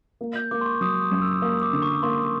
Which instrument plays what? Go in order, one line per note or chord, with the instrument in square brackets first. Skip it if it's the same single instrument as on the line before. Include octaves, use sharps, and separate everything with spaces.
[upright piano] A#3
[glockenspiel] G6
[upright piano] A#3 [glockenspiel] D6
[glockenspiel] C6
C#6
[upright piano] F#3 [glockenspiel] D#6
[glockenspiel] D#6
[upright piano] F#2
[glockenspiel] E6
[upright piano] A#3 [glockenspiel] D#6
[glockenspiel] D6
[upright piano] D3
[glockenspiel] C#6
[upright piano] A#3 [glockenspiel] C6